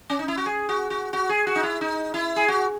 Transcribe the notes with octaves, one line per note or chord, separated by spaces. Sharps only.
C#4
D#4
E4
F#4
G#4
F#4
F#4
F#4
G#4
F#4
D#4
E4
D#4
E4
G#4
F#4